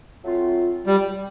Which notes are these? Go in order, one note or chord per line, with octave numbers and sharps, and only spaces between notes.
F#3 A3 C4 F4
G3